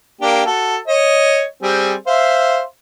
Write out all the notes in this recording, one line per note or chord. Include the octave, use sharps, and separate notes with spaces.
A#3 D4 G4
F#4 A4
C#5 D#5
G3 C4 G#4
C5 E5 F5